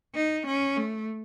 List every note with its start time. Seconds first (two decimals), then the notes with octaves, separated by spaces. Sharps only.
0.15 D#4
0.47 C#4
0.77 A3